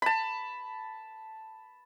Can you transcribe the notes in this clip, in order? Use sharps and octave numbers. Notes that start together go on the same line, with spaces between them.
A5 B5